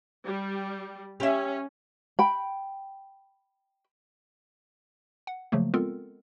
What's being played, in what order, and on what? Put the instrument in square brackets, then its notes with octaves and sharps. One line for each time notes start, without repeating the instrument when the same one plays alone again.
[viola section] G3
[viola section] C#4 [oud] G4 E5
[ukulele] G5 B5
[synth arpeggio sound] F#5
C#3 F3 F#3 A3 A#3
G#3 B3 C4 F4 A4 A#4